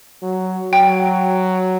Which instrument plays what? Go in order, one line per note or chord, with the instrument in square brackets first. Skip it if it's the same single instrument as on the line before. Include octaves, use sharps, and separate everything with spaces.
[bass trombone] F#3
[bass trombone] F#3 [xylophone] G5